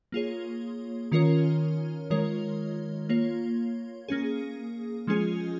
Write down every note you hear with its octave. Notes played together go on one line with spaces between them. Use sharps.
A#3 F4 G#4 C#5
D#3 C#4 F4 A#4 C#5
D#3 G#3 F4 A#4 C#5
A#3 F4 C#5
A#3 C#4 G#4
F3 G#3 C#4 F4 G#4